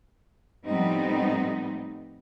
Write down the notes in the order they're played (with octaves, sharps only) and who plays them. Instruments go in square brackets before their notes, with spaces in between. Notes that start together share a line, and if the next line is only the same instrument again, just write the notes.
[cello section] A2 F3 G3 B3 C4 D#4